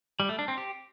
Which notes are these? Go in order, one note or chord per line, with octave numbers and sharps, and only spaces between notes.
G3
A3
D4
C4
G4